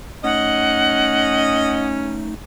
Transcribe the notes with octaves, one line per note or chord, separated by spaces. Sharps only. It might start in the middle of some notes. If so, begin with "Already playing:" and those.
A3 C#4 D#4 D#5 F#5